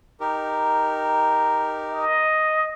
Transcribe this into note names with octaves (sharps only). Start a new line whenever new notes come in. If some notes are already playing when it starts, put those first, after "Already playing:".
D#4 G4 A#4
D#5